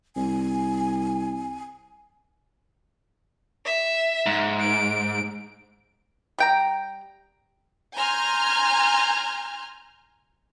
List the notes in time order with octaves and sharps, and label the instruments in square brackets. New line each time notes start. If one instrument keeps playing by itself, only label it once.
[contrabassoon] C2 [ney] G#5
[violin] E5
[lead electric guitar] G#2
[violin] D7
[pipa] G3 G5 A#5
[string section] G#5 A#5 C6 F6 G6 G#6